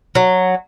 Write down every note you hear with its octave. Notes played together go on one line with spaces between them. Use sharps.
F#3